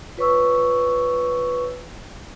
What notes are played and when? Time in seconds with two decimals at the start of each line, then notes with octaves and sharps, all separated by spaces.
0.17 F4 B4 C#5 C#6 E6